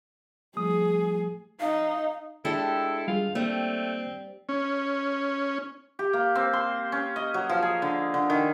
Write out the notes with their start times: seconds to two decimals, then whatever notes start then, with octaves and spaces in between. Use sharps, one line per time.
0.57 F3 G3 A3 G#4 D#6
1.60 D#4 F5
2.45 G#3 D4 E4 G4 A4
3.08 G3 F4 G#4 F5
3.35 G3 A3 A#3 C4
4.49 C#4
5.99 G4
6.13 A#3
6.35 C4
6.53 C6
6.92 C#4
7.16 D#5
7.34 F#3
7.49 F3
7.62 G#4
7.82 D3
8.14 D3
8.30 D#3